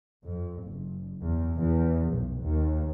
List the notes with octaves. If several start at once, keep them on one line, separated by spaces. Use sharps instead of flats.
F2
F#1
E2
E2
B1
D#2